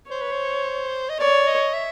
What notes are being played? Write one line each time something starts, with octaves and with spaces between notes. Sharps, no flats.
C5 C#5
B4
C5
D#5
C#5 D5
D#5
E5